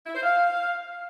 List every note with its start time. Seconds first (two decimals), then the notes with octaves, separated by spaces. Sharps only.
0.06 E4
0.15 C5
0.23 F5